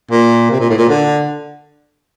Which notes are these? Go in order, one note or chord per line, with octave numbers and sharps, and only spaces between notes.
A#2
C3
A#2
A2
A#2
D3